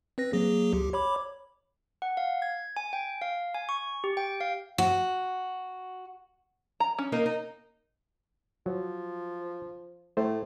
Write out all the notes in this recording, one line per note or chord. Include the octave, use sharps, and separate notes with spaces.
C4 B4 A#6
F#3 A#3 G#4
C#2 G4
C#5 B5 D6
F#5
F5
G#6
G#5
G5
F5
G#5
C#6
G4
G5
F5
F#4
A#5
C#4
A#3 D#4 A#4
D#4
F3 F#3
A2 A3 C5